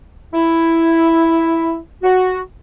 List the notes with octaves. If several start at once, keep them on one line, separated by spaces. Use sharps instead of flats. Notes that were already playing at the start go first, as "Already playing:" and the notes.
E4
F#4